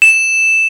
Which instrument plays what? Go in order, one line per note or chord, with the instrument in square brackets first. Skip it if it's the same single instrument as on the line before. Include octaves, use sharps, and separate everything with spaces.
[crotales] E7